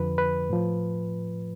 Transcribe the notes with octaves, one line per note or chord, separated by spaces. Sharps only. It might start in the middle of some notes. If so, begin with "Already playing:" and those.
Already playing: F2 D3 F3 B4
B4
A2 F3